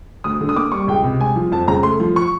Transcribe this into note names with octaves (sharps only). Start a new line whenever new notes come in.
D2 D#6
D3
D#6
A#3 D6
G3 C#6
C#2 G5
C3
G#3 G#5
F3
F2 A5
C#3 A#5
A3 C6
F3
C#6